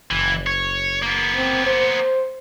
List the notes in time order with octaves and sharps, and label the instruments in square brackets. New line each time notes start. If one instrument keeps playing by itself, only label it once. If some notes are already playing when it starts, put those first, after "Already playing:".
[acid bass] F#1 [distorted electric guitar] E3
[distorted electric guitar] C#5
A#3 B3
[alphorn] C4
C5